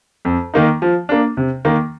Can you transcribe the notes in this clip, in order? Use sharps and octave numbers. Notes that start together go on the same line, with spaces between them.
F2
D#3 A#3 D#4
F3
A#3 D4
C3
D#3 A#3